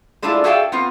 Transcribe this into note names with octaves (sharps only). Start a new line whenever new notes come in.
G#3 A3 D4 E4 F4 G#4
F#4 G#4 A4 E5 F5 G5
B3 C4 F4